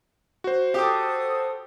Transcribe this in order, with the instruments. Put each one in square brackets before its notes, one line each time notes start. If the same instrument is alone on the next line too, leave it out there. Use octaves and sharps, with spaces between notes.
[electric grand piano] F#4 C5
[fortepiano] G4 D6 [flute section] A4 D#6